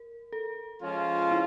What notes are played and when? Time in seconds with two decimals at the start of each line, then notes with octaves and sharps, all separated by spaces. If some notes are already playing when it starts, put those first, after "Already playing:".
Already playing: A#4
0.33 A4
0.81 F3 G#3 C#4 F4
1.31 E4